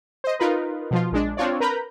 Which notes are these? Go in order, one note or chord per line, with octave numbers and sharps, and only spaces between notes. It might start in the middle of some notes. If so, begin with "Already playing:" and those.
C5 D#5
D#4 F4 A#4 B4
B2 F3 F4
A#1 G#3 D4
C4 D4 F4 C#5 D5
A#4 B4 A#5 B5 G6